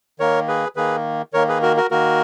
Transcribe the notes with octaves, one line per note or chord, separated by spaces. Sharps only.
D#3 A#3 A#4 C#5
G#4 B4
D#3 A#3 G#4 B4
D#3 A#3 A#4 C#5
G#4 B4
F#4 A#4
F#4 A#4
D#3 A#3 F#4 A#4